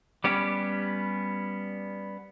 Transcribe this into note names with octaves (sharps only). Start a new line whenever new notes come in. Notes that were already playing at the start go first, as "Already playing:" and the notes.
G3 B3 C#4 G4